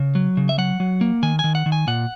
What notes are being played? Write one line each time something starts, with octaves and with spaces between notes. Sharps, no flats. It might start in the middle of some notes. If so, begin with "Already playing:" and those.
Already playing: C#3
F#3
C#3
E5
F#3 F#5
F#3
A#3
D#3 G#5
D#3 G#5
F#5
D#3
G#5
A#2 F#5